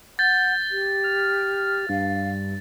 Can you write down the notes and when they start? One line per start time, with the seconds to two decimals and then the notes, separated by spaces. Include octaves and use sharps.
0.19 F#5 G6 A6
0.71 G4
1.04 F6
1.89 G2 F5